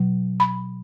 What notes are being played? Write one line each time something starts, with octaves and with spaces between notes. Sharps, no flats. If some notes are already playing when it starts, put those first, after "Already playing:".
Already playing: B2 F#3
B5